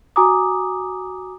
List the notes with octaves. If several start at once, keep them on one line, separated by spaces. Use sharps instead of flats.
F#4 G#5 A#5 D6 D#6